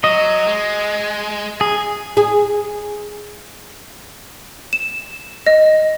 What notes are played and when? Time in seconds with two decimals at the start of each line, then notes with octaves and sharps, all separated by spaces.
0.04 F#3 D#5
0.47 G#3
1.61 G#4 G#5
2.17 G#4
4.73 E7
5.47 D#5